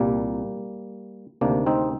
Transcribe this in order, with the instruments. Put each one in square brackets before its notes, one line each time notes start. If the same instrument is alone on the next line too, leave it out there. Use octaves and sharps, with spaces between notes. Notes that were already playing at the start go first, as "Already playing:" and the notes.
Already playing: [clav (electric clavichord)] C2 A#2 G3 A#3
D2 C3 D#3 A#3 D4
C4 D#4